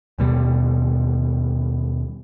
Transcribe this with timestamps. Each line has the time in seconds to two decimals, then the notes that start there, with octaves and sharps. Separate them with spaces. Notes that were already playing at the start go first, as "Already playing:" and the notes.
0.19 D#2 B2 G3